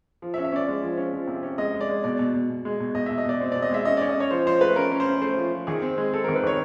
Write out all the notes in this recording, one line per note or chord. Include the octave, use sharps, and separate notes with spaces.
F3
E5
C#4
E5
C#4 D5
G#3
F3
C#4
F3
C3
C#4
G#3 D#5
G#3
D5
G#3
B2 D5
B2
B2
B2
G#3
B2
B2 D#5
B2 E5
D#5
B2 D5
C4
B2 D5
D#5
G#3 E5
C#4 D#5
C#4 D5
D#5
C#4 C#5
F3 C5
F3 C5
A3 B4
C#4 A#4
C#4
C5
C#4
A3 C5
F3
F3
D#3 G#4
C4
G#3
C4 A4
D#3 A#4
B4
D#3 C#5